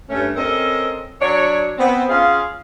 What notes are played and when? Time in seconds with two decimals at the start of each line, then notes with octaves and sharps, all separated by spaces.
0.10 G2 A3 C#4
0.36 C4 C#4 A4 A#4 D#5
1.21 F#3 D4 C#5
1.78 B3 C4
2.09 C#4 F4 G#4 F5